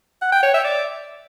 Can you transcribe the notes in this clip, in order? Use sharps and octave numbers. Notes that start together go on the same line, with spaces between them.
F#5
G5
C#5
E5
D5